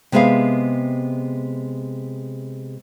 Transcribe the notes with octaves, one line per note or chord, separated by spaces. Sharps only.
C3 G#3 B3 G#4 E5 F5